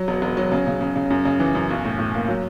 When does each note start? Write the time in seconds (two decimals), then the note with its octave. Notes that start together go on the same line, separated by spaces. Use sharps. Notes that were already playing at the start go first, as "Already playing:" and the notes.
Already playing: F#3
0.08 E1
0.22 E1
0.37 F#3
0.52 C#3
0.67 C#3
0.81 C#3
0.96 C#3
1.10 F#2
1.25 C#3
1.40 E3
1.55 F#2
1.70 B1
1.85 A2
1.99 A2
2.14 A#3
2.28 F#3